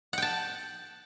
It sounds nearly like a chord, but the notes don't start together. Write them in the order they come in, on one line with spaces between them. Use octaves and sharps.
F#5 G5 A5